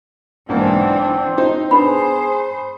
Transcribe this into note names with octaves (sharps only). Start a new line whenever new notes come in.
B1 G#2 E3 A#3 C4 D4
D#4 C5
B3 D4 G#4 C5 B5